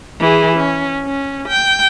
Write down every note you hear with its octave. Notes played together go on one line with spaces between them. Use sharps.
E3 G#4
C#4
C#4
G5